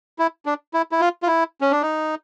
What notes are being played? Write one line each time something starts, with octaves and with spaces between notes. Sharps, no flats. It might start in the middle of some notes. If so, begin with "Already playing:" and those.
E4
D4
E4
E4
F4
F4
E4
C#4
D4
D#4